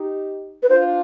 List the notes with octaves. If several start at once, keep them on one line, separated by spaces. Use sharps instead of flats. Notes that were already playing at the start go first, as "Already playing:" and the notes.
Already playing: D#4 G4
B4
D4 F4 C5